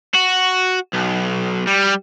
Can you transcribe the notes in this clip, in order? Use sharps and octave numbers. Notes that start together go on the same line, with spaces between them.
F#4
B1
G3